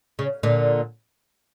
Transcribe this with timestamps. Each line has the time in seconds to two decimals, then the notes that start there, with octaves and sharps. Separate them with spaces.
0.19 C#3
0.43 A#2 D3